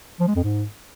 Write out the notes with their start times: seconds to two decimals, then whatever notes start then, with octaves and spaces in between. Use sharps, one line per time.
0.20 F3
0.28 G#3
0.36 F2
0.44 G#2